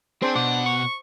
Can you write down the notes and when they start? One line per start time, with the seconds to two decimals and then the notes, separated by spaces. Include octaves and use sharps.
0.22 C4 D4 G#4 C5
0.36 B2 F#5 D6
0.66 C#6